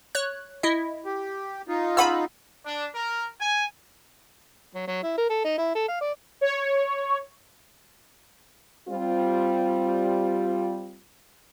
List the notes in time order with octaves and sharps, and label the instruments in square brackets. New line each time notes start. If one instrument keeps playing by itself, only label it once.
[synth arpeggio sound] C#5 F#6
E4 D#5
[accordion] G4
D#4 F4
[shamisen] C#3 F#5 G#5 [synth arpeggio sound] B5 E6
[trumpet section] D4
A#4
G#5
[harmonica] F#3
F#3
E4
A#4
A4
D#4
E4
A4
F5
D5
[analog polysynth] C#5
[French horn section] G3 C4 F4